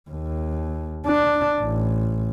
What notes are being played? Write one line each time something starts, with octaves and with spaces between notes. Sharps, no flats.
D#2
D4
A1